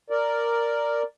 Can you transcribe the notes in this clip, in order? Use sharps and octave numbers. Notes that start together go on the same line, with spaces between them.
A#4 D5